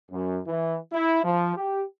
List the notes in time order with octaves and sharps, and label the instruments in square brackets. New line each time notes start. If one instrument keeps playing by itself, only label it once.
[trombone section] F#2
E3
E4
F3
G4